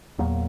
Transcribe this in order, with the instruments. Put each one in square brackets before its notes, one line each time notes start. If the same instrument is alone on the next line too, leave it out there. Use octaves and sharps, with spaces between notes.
[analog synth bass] E2 [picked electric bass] A#2 F#3 A#3